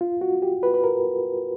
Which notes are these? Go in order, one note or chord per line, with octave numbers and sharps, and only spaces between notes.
F4
F#4
G4
B4
B4
A#4